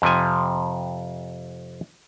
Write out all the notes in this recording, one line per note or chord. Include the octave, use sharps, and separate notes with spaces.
F2 C3 F3 G#5